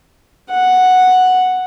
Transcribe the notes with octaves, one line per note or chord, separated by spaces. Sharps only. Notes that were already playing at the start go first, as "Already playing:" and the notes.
F#5